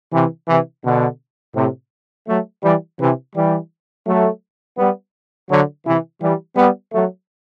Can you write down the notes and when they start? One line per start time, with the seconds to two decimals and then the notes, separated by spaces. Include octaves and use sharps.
0.12 C3 E3
0.47 C3 E3
0.83 B2 D3
1.54 A2 C3
2.27 F#3 A3
2.62 E3 G3
2.99 C3 E3
3.34 E3 G3
4.05 F#3 A3
4.77 G3 B3
5.49 D3 F#3
5.84 C3 E3
6.20 E3 G3
6.56 G3 B3
6.92 F#3 A3